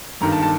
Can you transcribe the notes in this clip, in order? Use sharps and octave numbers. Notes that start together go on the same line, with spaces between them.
G1 G2 D#3 A#5
A5
A5